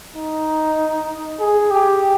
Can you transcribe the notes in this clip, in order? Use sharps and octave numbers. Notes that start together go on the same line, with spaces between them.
D#4
G#4
G4